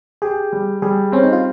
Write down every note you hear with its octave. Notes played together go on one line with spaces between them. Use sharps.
G4 G#4
G3
G3 G#4
C4 C#4
D#4
F4